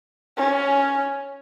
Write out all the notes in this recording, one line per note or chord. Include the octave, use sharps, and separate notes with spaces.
C#4